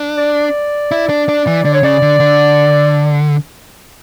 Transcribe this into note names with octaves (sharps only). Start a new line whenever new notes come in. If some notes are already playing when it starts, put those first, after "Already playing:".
Already playing: D4
D5
E4
D4
D4
E3
D3 D5
C#5
C#3 D5
D3
D3